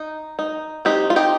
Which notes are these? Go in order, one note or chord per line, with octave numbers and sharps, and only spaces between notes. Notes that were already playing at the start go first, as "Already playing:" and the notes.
Already playing: D#4
D#4
C4 D#4 G4
F4
D#4 G4